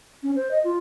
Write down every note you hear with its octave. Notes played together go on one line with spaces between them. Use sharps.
C#4
C5
D#5
F4